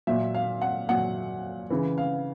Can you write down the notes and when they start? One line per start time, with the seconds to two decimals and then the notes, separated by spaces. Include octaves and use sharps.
0.07 A#2 F#3 E5
0.34 F5
0.61 F#5
0.89 A#2 F#3 F#5
1.70 C#3 E3
1.98 F5